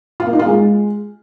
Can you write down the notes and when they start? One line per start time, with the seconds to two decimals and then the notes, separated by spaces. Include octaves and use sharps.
0.20 F4
0.26 A#3
0.33 D#4
0.39 F4
0.46 G#3